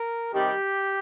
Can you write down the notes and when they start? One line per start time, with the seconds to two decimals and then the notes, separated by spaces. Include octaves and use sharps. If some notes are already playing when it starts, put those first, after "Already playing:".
Already playing: A#4
0.33 C3 D#3 G3 G4